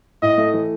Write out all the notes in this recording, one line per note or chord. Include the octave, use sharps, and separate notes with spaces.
A2 D#5
A3
E3